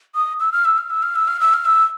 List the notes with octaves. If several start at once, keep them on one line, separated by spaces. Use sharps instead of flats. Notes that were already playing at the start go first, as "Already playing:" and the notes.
D#6
E6
F6
E6
F6
E6
F6
E6
F6
E6
F6
E6